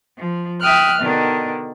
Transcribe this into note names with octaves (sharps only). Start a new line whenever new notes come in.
F3
E5 G5 D#6 F6 F#6
B2 D3 D#3 D4